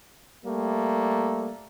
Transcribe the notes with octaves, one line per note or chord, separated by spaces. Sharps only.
G3 A3 A#3